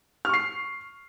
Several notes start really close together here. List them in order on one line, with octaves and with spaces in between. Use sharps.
F6 C#6 C7